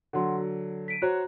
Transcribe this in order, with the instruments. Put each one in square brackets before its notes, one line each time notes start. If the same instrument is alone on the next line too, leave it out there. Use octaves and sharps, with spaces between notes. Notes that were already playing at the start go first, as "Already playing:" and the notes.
[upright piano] D3 F#3 [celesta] F#5 C6
[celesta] F#4
B6 D7 D#7
[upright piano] F#4 C5 C#5 [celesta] A#5 F#6